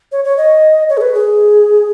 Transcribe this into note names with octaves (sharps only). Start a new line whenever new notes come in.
C#5
C#5
D#5
C#5
G#4
B4
G#4